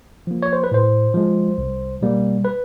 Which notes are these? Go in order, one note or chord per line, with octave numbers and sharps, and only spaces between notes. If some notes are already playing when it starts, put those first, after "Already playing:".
F3 A#3
C#5
C5
B4
A2 C5
F3 G#3
C2
B2 G3 A#3
B4